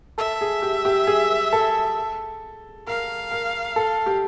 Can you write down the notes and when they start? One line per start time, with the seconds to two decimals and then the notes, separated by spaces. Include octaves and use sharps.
0.18 A4 E5
0.41 G#4
0.62 G4
0.85 G4
1.07 G#4
1.53 A4
2.87 A#4 F5
3.31 A#4
3.76 A4
4.06 G4